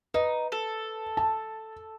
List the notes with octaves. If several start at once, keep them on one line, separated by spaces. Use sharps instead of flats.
D#4 B4
A4
A5